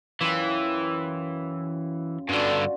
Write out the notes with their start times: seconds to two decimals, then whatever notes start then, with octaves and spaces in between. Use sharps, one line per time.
0.21 F#2 E3 F4 G5
2.29 G2 D3 D4 F4 F#4